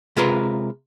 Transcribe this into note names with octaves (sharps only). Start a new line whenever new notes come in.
C3 G#3 F4 A#4 B4 C6